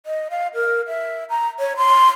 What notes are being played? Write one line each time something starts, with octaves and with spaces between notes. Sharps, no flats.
D#5
F5
A#4
E5
A#5
C#5
C6